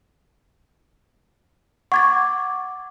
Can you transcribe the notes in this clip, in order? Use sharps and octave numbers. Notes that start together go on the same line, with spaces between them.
F#5 C#6 D6 G#6 A6